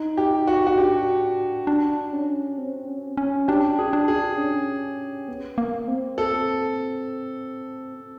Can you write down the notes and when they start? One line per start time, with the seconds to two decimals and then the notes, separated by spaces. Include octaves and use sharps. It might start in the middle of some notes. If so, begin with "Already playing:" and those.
Already playing: D#4
0.18 G4
0.47 F#4
0.67 F#4
0.77 D4 G4
1.67 D4
2.13 C#4
2.58 C4
2.88 C#4
3.17 C#4
3.48 D4 G4
3.79 G#4
3.93 D4
4.08 G#4
4.38 C#4
5.28 B3
5.58 A#3
5.88 C4
6.18 A4